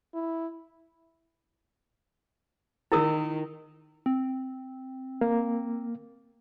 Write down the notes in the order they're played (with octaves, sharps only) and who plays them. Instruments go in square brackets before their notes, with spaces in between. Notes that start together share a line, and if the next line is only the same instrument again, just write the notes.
[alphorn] E4
[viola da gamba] D#3 [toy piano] E4 A#4 D#6
[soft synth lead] C4
[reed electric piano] A#3